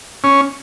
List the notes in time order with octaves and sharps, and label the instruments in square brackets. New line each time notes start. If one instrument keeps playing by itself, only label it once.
[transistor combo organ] C#4